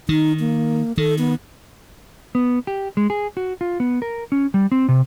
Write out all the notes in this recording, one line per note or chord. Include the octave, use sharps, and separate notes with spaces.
D#3 D#4
A#3
D#3 A4
B3
B3
G4
G#3
G#4
F#4
F4
B3
A#4
C#4
G3
C4
C3